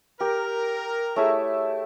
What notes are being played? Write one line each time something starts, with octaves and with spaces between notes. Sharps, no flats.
G4 A#4
A3 E4 G4 G#4 C#5 E5